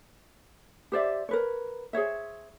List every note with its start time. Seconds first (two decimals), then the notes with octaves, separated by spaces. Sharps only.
0.92 G4 C5 D5 E5
1.29 A#4 B4 C#5
1.93 G#4 C5 C#5 E5